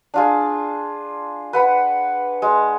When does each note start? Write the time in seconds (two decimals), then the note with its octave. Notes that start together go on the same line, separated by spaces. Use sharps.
0.14 D4 F4 G#4
1.53 B4 F#5 B5
2.42 G#3